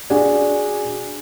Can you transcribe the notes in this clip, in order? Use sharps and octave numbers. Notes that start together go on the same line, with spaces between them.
D4 F#4 G#4 D5 G#5